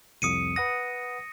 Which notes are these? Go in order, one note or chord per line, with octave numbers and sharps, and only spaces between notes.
C2 F2 D#6 C#7 D#7
B4 F#5 D#6 A#6